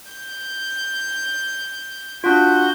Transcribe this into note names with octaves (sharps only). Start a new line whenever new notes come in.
G6
D4 F4 F#4 G6